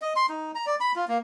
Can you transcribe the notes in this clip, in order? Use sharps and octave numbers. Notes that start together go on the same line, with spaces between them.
D#5
C6
D#4
A#5
D5
B5
F4
A#3